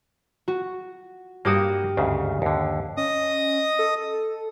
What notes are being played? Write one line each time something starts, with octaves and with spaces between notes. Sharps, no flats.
F#4
G2 A#3 F#4 G4 D#6
D2 G#2 C#3
D#2 D3
C#4 D#5 D#6
A4